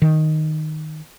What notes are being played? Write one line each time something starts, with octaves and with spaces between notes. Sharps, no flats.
D#3